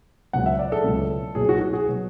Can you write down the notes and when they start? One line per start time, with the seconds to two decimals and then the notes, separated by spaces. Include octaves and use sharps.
0.33 C#2 B2 F#3 F#5
0.46 E5
0.59 D5
0.72 A4
0.84 C#2 B2 F#3
1.35 B1 B2 F#3 G#4
1.49 F#4
1.61 F#4
1.73 G#4
1.88 B2 F#3